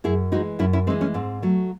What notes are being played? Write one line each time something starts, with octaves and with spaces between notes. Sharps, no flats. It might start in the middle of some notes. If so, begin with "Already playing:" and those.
F#2 E4 G#4
E3 G#3 D#4 F#4
F#2 C#4 E4
C#4 E4
E3 G#3 C4 D#4
A3 C#4
G#2 C4
F#3 A3